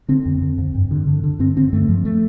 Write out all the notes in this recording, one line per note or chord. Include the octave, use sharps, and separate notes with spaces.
D3 C4
F2
D3
F2
G2
D3
D3
D3
G2 C4
D3 C4
G2 A3
G2 F3
A3